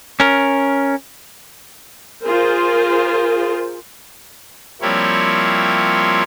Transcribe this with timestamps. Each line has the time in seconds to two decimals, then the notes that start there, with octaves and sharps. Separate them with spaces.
0.20 C#4 A#4
2.23 F4 G#4 A#4 C5
4.82 F3 G3 A#3 C4 E4 C#5